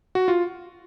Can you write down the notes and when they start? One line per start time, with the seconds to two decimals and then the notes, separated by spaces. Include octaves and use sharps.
0.15 F#4
0.28 F4